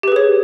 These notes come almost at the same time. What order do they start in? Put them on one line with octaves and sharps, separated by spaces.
G4 B4 G#4 C#5